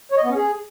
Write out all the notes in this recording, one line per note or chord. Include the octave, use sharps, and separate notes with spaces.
C#5
D#5
B3
C#4
G#4